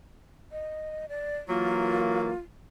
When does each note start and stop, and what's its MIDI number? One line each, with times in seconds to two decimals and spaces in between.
0.52 1.06 75
1.09 1.37 74
1.48 2.31 52
1.48 2.31 54
1.48 2.31 58
1.48 2.39 65